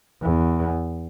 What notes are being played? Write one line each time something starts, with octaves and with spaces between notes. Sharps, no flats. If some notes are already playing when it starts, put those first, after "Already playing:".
E2